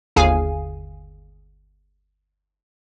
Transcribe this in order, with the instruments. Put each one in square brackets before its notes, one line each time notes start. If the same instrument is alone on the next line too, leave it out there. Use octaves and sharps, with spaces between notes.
[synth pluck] G1 D#2 G#4 F5 G#5